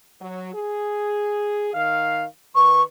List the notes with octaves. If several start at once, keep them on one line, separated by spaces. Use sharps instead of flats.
F#3
G#4
D#3 F5
D#3 B4 C#6